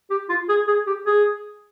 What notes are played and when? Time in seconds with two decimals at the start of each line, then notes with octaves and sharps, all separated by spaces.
0.10 G4
0.29 F4
0.49 G#4
0.68 G#4
0.87 G4
1.06 G#4